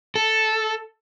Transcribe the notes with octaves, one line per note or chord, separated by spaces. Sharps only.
A4